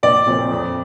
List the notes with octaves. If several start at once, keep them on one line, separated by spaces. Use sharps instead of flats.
A#1 D5
A#2 F3 C4
F2